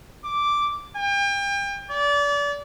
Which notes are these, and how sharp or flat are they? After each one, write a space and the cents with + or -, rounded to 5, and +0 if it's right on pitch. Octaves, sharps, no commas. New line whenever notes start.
D6 -5
G5 +35
D5 -30